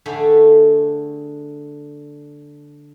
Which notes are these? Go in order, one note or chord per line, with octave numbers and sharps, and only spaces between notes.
D3 A3 G#4 G5 B5